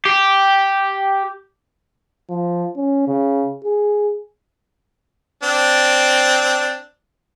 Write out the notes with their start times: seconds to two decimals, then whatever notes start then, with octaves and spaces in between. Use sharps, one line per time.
0.05 G4
2.30 F3
2.76 C#4
3.08 C#3
3.64 G#4
5.43 C4 D4